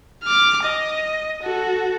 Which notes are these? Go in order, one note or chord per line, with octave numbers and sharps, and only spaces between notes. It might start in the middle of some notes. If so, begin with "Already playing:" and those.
D6 F6
D#5
F#4 A4